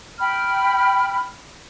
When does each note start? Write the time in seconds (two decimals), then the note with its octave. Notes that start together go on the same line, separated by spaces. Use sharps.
0.19 G5 B5 F6